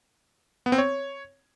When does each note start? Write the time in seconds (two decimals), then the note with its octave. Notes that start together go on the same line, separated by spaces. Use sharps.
0.66 B3
0.72 C4
0.78 C#5